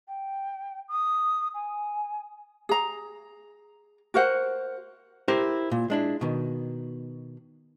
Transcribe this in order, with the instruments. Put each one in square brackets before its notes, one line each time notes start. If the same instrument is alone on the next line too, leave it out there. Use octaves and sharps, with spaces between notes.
[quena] G5
D#6
G#5
[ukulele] G#4 A#5
F#4 A#4 C5 F#5
[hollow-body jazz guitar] E4 G4 A#4 C5
A#2
G#3 D4 E4
B2 D#3